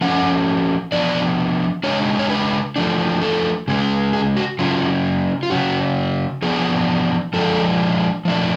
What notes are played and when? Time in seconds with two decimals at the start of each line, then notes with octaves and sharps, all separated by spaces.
0.01 F3 A3 C#4 F#5
0.92 F3 B3 D4 D5
1.84 C#3 G#3 D4 C#5
2.19 C#5
2.30 B4
2.76 F3 A3 D4
3.22 A4
3.68 C#3 G#3 C#4
4.13 G#4
4.37 F#4
4.59 C#3 F#3 C#4 F4
5.43 F4
5.50 C#3 F#3 C#4 F#4
6.42 F3 B3 D4 G#4
7.33 F3 G#3 D4 A4
8.25 F3 A3 D4